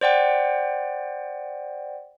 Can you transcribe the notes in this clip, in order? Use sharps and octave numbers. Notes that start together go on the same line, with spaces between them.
C5 D5 F#5 G5